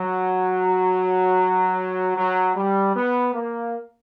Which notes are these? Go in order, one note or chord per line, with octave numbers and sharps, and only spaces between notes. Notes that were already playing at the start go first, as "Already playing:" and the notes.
Already playing: F#3
F#3
G3
B3
A#3